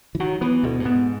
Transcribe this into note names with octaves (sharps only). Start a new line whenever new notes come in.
E3
D#3 F#3
E3 B3
D2 B2
G2
G#2 B3